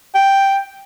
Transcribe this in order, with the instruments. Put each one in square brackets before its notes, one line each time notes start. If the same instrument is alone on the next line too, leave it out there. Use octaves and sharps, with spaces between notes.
[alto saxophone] G5